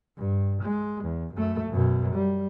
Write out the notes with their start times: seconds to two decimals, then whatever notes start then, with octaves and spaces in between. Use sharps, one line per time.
0.17 G2
0.62 G#3
1.04 E2
1.34 F#2 A3
1.70 F#2 B2
2.14 G3